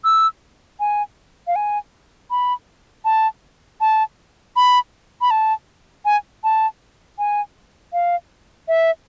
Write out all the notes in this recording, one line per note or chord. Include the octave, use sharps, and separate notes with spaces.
E6
G#5
F5
G#5
B5
A5
A5
B5
B5
A5
G#5
A5
G#5
F5
E5